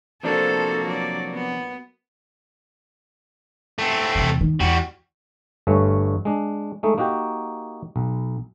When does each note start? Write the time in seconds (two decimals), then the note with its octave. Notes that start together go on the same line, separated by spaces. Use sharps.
0.23 C3 F3 A#3 D4 F#4 A4 C5
0.85 F#3 D5
1.35 B3
3.78 A3 C4
4.15 E2 C3
4.41 D#3
4.61 E2 G3 F#4
5.67 G1 G2 A3 C#5 G#5
6.25 G#3 D4
6.83 G#3 A3 D#4
6.98 A#3 D#4 F#4 G4 G5
7.96 B1